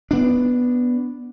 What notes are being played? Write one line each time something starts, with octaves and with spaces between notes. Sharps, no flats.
B3 D4